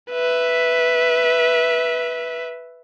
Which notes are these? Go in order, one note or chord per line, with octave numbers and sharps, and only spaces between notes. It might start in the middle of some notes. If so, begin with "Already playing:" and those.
B4 E5